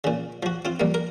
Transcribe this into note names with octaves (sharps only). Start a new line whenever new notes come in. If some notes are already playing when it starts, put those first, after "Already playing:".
A#2 C#3
F3 F#4
C4 F4
G3 A#3
A#4